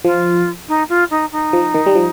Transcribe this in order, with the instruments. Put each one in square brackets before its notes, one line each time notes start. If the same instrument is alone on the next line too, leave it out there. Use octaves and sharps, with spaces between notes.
[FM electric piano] F3 [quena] F4
[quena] D#4
F4
D#4
D#4
[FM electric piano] F3
D#3
G3
F3